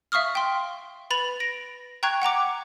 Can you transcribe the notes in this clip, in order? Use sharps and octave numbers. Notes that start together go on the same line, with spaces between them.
E5 F5 C#6 D#6 F6
G5 C6
B4 B5 A6 F7
A#6 D7
G5 A#5 C#6 F#6 G#6
F#5 G5 A#5 D6